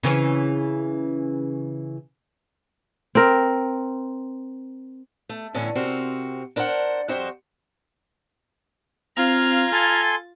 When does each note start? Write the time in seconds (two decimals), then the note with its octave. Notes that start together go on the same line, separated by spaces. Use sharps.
0.03 C#3 E3 C#4
3.15 C4 A#4
5.29 A3
5.54 A2 D3 E3 C#4
5.75 C3 C4 F#4 A#4
6.56 D4 A#4 C5 D5 F#5
7.08 F2 F3 G3 F#4 C5 G5
9.17 C4 F4 F5 A#5 F6 G#6
9.72 A4 G#5 C6 A6